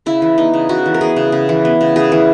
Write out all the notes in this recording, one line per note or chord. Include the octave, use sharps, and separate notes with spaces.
C#3 E4
E3
B3 D#4
C#3
C#3 F#4
E3
A#4
B3 G#4
C#3
C#3
E3
B3
C#3
C#3 G#4
E3